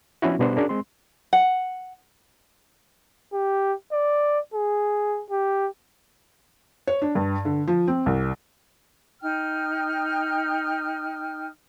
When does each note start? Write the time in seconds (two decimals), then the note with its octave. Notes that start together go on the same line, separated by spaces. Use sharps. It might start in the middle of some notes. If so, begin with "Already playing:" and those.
0.22 F3 B3 C#4 D4 E4 F#4
0.39 B2 G3 B3 D4 G4 C5
0.57 C#4 D4 F#4 G#4 A#4
0.69 G#3 C4 C6
1.33 F#5
3.33 G4
3.92 D5
4.54 G#4
5.30 G4
6.87 C#5
7.02 D4
7.15 G2
7.45 D3
7.68 F3
7.88 C4
8.06 C2
9.21 D#4 G5 F6